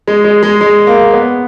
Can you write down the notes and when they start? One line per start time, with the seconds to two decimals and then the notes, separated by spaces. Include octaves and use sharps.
0.08 G#3
0.24 G#3
0.43 G#3
0.61 G#3
0.87 A#3
1.13 B3